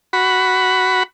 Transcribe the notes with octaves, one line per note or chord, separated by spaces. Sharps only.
F#4 B5